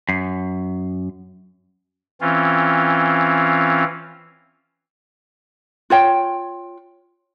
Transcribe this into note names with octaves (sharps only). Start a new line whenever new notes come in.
F#2
E3 C4 C#4 F4
F4 C#5 G5